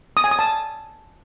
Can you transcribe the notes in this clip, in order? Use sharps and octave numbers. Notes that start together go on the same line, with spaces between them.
D#6
G#5
D#6
A5